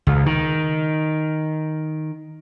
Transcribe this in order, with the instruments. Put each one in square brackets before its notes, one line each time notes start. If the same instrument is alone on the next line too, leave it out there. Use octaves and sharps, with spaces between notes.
[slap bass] C#2
D#3